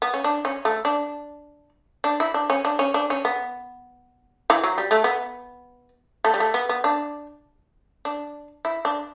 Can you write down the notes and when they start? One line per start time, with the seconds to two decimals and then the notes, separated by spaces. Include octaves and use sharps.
0.02 B3
0.14 C#4
0.24 D4
0.45 C#4
0.65 A3
0.85 D4
2.04 D4
2.20 E4
2.34 D4
2.50 C#4
2.65 D4
2.79 C#4
2.94 D4
3.10 C#4
3.25 B3
4.50 E3
4.64 F#3
4.78 G3
4.91 A3
5.04 B3
6.24 A3
6.34 G3
6.40 A3
6.54 B3
6.69 B3
6.84 D4
8.05 D4
8.65 E4
8.85 D4